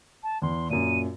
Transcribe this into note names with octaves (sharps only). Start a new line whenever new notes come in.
A5
E2 C6
F#2 A#2 D#7